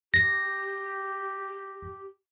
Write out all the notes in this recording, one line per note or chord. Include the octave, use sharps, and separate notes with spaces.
G4 A#6